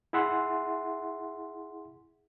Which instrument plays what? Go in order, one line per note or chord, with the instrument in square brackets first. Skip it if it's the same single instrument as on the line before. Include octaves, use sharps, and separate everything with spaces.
[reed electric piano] E4 G#4 E5 F#5 C6